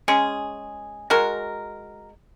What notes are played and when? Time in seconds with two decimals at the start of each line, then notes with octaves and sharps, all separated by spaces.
0.08 G#3 C#4 G#4
1.10 G#3 F#4 A#4